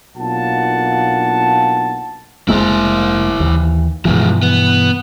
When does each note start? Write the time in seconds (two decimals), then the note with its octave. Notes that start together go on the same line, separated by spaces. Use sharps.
0.17 B1 A#3 D4 F4 F#5 A5
2.49 F1 G#3 A#3 E4 C5
3.40 D#2 E3
4.05 G2 B2 E3 F3 G#3
4.43 B3